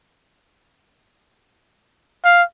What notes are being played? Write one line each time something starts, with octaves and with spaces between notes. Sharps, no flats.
F5